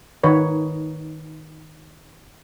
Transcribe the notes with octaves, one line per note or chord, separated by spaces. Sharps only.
D#3 D#4 B4 C#5